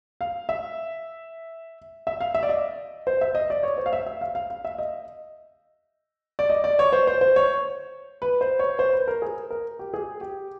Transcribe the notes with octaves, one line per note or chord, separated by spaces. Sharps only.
F5
E5
E5
F5
E5
D5
D#5
C5
E5
D#5
D5
C#5
C5
F5
E5
E5
F5
F5
F5
E5
D#5
D5
D#5
D5
C#5
C5
C5
C5
C#5
B4
C5
C#5
C5
B4
A#4
G#4
A#4
G4
G#4
G4